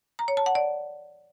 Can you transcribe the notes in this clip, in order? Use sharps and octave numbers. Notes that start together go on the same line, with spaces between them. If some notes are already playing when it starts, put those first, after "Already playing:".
A#5
C#5
A5
F#5
D5